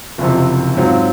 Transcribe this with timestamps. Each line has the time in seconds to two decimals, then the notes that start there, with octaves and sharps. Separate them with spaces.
0.18 F#1 F2 C3
0.77 G#2 F#3 C4 F4